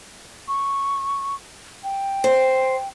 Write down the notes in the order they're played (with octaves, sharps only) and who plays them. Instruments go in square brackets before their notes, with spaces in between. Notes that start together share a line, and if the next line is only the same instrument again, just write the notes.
[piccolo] C#6
G5
[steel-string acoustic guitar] C5